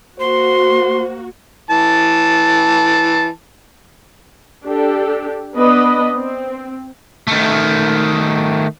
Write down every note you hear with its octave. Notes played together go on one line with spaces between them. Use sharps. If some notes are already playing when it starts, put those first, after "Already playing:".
A#3 F#4 C5 C6
E3 A5
D4 G4 A4
B3 D4 B4 D#5
C4
D#3 A3